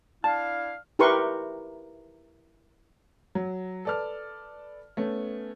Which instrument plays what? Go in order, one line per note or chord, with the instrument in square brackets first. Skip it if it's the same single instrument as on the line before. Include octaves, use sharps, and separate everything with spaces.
[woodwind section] D4 E4 F5 [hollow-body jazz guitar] A5
[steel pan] E4 G4 A#4 B4 C6 C#6
[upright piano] F#3
A4 B4 D5 A5 F6
A3 B3 C#4